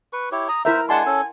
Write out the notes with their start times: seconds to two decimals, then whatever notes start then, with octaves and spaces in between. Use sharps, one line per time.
0.13 B4 C#6
0.32 E4 G4 C#5
0.49 A#5 D#6
0.65 E4 A#4 C5 E5 A#5
0.89 G#3 D4 F#5 G#5 A5 C6
1.06 C#4 A4